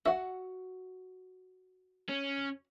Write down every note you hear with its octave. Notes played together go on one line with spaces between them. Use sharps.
F#4 E5 F#5
C#4